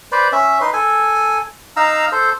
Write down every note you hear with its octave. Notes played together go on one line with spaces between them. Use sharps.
B4 C5 D5
C#4 E5
D#4 B4 C6
A4 G#5
D#4 F5 A#5 E6
A4 C5